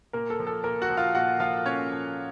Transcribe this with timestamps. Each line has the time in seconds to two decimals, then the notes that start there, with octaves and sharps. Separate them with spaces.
0.13 A#2 A#3 A#4
0.30 A4
0.39 F3
0.47 A4
0.64 A#2 A#3 A#4
0.82 F#4 F#5
0.89 F3
0.97 F4 F5
1.15 A#2 F#4 F#5
1.40 F3 F4 F5
1.66 A#2 C#4 C#5
1.91 F3